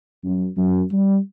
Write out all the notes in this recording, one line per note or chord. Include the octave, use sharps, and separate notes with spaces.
F#2
F#2
G3